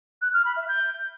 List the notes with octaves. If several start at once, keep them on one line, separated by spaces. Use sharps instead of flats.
F#6
F6
B5
E5
G6